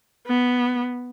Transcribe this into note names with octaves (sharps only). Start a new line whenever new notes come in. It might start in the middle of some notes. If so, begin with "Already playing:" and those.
B3